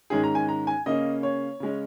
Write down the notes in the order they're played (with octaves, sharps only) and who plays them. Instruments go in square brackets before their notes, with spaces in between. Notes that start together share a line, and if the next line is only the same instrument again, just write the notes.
[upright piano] G#2 D#3 G#3 C#4 G#4
A#5
G#5
A#5
G#5
C#3 A#3 C#4 D#5
C#5
C#3 G#3 C#4